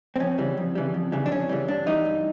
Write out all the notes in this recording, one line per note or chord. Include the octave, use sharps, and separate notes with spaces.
C4
F2 C#4
C#3 E3 G3
F2
C#3 E3 G3
F2
C#3 E3 G3
D4
F2 C#4
C#3 E3 G3
G2 D4
E3 G3 D#4
G2